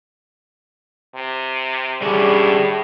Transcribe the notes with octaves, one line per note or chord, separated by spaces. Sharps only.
C3
A2 D3 G3 C#4 D4 G#4